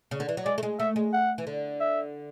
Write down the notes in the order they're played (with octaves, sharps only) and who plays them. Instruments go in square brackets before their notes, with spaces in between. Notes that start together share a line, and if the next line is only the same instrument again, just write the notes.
[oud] C#3
D3
E3
F#3
[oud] G#3 [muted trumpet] D5
[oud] A3
G#3
[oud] A3 [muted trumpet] E5
[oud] G#3
[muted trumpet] F#5
[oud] E3
D3
[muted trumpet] E5